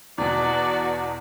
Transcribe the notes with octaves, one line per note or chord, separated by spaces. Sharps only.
E2 B2 F#4 D5